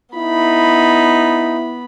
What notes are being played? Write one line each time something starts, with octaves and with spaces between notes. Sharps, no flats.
B3 D#4 E4 B5